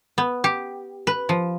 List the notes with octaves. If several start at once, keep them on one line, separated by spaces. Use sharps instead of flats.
B3
G4
B4
F3